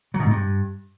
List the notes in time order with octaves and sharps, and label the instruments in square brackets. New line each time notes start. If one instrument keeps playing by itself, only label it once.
[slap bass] F#3
B2
G#2
G2